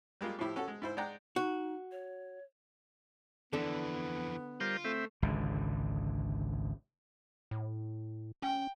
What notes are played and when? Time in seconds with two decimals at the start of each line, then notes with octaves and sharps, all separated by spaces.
0.21 G3 G#3 A#3 F4
0.39 A2 F3 E4 G4
0.56 C#4 F#4 A4
0.68 G#3
0.82 G#2 E4 C5
0.97 G#3 D5 F#5 G5 A#5
1.36 D#4 F#4
1.92 C#5
3.53 F2 D3 E3 B3 A4
4.61 G3 F4 A#4 C5
4.85 A3 C4 E5
5.22 G#1 C#2 D3
7.51 A2
8.42 C#4 G5